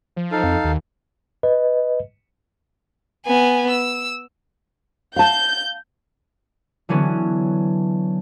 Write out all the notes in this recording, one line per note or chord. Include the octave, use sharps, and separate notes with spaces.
F3
D#4 A4 F5
F2
D#2
B4 D#5
B3 G#5
E6
F5 A5 G6
D3 E3 F#3 B3 C#4